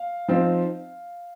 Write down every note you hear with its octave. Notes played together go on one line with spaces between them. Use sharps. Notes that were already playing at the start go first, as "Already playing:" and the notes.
Already playing: F5
F3 C4 D#4